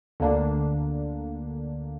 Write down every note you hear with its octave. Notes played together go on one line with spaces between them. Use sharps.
D2 D3 A#3 D4